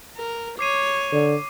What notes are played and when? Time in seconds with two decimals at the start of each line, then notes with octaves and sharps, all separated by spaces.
0.17 A#4
0.59 C#5 D6 C7 D#7
1.12 D3